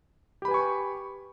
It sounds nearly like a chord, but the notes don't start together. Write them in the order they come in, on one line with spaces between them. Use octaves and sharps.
G4 B5 B4 G#5 C#6